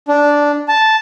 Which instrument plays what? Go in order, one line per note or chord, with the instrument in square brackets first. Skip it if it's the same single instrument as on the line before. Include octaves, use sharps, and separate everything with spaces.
[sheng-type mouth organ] D4
A5